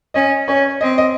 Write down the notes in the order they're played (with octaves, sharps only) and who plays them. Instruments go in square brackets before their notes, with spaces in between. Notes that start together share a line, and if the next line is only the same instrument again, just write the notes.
[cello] C#4 [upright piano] D#5
[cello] C#4 [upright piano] C#5
[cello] C4 [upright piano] D#5
[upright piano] D#5